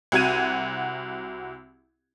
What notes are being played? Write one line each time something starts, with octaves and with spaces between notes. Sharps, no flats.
C2 F#4 F#5 G#6 D#7